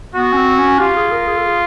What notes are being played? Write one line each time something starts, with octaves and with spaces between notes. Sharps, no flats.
B3 F#4
C#4
C4
C#4
F4 G4
G#4
A#4
G#4
A4
G#4